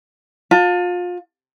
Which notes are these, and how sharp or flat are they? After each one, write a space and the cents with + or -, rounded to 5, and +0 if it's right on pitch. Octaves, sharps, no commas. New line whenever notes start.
F4 +30 A5 +20